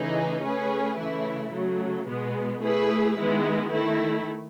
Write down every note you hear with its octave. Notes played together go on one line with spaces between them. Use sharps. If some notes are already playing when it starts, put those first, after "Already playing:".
Already playing: C#3 E3 A3 D#4 G#4
A3 C#4 G#4 B4
C#3 E3 A3 E4
C#3 F#3 A3
B2 G#3 B3
A3 E4 G#4 B4
D#3 G#3 B3 E4
D#3 A3 E4